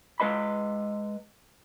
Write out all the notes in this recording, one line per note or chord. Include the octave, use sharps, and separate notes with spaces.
G#3 B4 D#5 B5